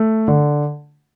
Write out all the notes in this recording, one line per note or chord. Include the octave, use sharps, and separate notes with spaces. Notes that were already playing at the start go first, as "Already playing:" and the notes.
Already playing: A3
D3